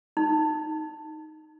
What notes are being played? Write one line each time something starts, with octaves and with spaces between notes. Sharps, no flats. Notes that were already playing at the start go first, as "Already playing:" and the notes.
D#4